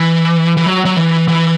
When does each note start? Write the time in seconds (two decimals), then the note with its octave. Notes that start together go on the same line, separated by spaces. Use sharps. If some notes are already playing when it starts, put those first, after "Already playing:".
Already playing: E3
0.57 E3
0.66 F#3
0.85 F#3
0.96 E3
1.28 E3